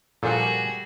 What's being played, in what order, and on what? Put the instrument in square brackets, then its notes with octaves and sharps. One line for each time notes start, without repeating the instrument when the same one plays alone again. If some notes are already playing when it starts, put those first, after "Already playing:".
[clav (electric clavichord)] A#2 F3 F#5 [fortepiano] G3 A4 [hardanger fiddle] F#4 G#4 [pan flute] G#5